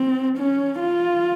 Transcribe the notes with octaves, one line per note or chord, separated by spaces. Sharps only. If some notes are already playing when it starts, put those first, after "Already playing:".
Already playing: C4
C#4
F4